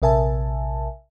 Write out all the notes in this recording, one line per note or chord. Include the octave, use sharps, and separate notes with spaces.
A#1 C3 A#4 E5 G#5 A5